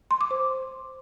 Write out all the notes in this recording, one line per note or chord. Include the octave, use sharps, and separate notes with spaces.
C6
D6
C5